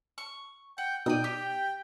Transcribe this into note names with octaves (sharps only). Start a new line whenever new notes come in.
C#6
F#5 G5
B2 D#4 D5 G5 D#6 D#7
G4 D6